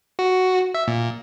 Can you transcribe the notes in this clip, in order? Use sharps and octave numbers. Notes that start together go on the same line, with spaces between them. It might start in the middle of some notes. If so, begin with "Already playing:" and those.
F#4
E5
A#2